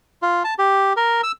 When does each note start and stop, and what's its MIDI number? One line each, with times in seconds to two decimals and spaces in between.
0.22 0.43 65
0.44 0.54 81
0.59 0.93 67
0.96 1.21 70
1.23 1.32 88